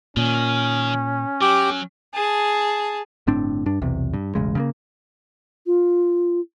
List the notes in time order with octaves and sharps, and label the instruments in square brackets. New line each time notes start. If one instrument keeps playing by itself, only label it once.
[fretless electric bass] A#2 [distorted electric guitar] D#3 [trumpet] C#4
[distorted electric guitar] F#3 [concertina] G4 D6
[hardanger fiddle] G#4 A5
[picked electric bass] G1 A2 C4 D4
G2 D4
B1 E2 C3
G2
E1 A1 C#3 G#3
C#3 G3 A#3
[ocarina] F4